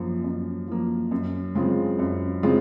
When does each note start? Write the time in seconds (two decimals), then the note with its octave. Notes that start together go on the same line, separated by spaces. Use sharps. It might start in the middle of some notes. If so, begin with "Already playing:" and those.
Already playing: F#2 F3 A#3
0.24 F#2
0.68 F3 A#3
1.11 F#2
1.55 C#3 G#3 C4 F4
1.99 F#2
2.43 C#3 G#3 C4 F4